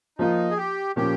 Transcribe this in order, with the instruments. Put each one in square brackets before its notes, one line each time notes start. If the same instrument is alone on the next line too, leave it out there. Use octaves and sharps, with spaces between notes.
[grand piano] F3 A#3 F4 [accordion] D#4
[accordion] G#4
G4
[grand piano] A#2 F3 A#3 C#4 [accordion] G4